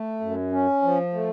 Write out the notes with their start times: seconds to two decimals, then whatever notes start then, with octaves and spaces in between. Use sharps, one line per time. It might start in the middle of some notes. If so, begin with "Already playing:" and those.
Already playing: A3
0.20 F#2
0.52 C#4
0.82 F3
1.13 A3